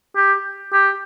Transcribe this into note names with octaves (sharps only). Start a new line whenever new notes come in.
G4
G4